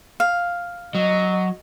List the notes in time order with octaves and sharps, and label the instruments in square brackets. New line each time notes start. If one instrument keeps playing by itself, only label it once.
[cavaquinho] F5
[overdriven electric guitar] F#3 [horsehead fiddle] D#5